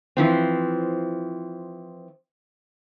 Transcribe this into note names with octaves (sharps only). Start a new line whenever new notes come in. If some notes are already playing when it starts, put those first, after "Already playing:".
E3 F3 C4